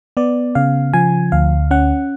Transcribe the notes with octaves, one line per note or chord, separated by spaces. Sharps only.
B3 D5
C#3 F5
F3 G#5
D2 F5
C#4 F#5